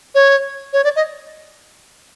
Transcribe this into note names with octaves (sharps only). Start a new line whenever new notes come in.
C#5
C#5
D5
D#5